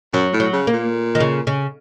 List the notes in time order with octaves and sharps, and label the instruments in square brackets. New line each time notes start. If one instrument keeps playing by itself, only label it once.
[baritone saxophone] F#2 [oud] F#3
[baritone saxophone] A2
[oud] F#3
[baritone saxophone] C#3
[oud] A#3
[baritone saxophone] A#2
[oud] D#3
C#3
C#3